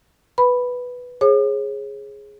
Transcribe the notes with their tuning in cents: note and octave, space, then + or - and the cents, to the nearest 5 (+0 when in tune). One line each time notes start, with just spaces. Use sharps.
B4 +0 B5 +0
G#4 +0 C#5 -35 D6 +45